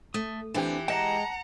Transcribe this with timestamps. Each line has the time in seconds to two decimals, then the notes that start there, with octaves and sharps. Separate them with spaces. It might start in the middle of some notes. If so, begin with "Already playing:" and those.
0.14 A3 D#6
0.54 D3 E3 C4 G4
0.88 G#3 D#5 F#5 G5 A5 A#5